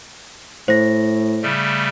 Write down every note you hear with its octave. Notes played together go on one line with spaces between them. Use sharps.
A2 C5 A#6
C#3 G3 A3